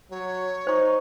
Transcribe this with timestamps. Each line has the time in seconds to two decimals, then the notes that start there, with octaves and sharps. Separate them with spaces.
0.11 F#3 C#5
0.67 D#4 C5 C#6